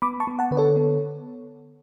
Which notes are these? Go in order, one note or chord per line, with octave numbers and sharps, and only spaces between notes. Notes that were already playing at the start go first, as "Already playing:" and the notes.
B3 B5 D6
A5 C#6
B3
F#5 A5
D3 B4
A4 C#5
B3